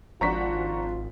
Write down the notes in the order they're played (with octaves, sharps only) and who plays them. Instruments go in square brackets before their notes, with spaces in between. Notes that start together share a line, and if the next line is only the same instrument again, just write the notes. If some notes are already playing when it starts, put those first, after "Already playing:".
[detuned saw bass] G#1 [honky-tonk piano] F3 D4 F#4 [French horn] F4 [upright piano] A#5 C#6 B6